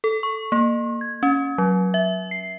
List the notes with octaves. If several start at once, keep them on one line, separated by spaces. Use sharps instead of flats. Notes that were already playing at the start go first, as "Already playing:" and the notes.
A4
C#6
A#3
G#6
C#4
F#3
E5
C7